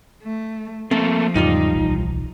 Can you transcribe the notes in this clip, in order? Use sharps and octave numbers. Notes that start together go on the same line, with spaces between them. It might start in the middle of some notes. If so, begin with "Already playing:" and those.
A3
F3 A3 A#3 C4 A4
E2 G#2 C#3 G3 D#4 F4 D5
D1 B1 E3